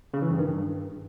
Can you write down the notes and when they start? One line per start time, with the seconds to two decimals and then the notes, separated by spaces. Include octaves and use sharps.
0.14 C#3
0.22 E3
0.30 G2
0.39 D#3
0.47 G2